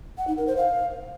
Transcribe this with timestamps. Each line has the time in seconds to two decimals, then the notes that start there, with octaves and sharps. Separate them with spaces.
0.18 F#5
0.27 D#4
0.37 A#4
0.47 C5
0.57 F5